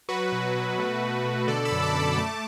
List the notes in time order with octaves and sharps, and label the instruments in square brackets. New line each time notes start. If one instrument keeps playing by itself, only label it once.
[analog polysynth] F#3 F#4 B4
B2
B2
A3
B2
B2
D3 A4 D5
B5 E6
F#2
A5 D6
F#2
B5 E6
A3 A5 D6